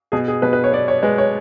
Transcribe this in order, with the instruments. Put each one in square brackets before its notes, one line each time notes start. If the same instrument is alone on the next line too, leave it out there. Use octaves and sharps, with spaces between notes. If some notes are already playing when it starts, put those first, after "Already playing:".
[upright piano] B2 G#4
G#4
B2 B4
B4
C#5
B3 D5
C#5
G#3 B4
C#5